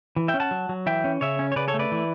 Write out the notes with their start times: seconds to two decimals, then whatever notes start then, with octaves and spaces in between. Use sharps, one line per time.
0.16 E3
0.28 E5 G5
0.34 C#4
0.40 F#5 A5
0.51 F#3
0.69 F#3
0.86 E3 E5 G5
1.04 C#4
1.21 C#3 C#5 E5
1.39 C#4
1.52 C#5
1.56 C#3 B4 D5
1.68 A4 C#5
1.74 A3
1.79 B4 D5
1.92 E3